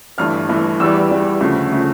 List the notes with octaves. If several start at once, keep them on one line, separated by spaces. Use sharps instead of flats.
G1 G2 E3 A3 F6
G1 G2 E3 A3
E2 E3 G3 E6
E2 E3 G3
D2 C#3 F3 A3
C#3 F3 A3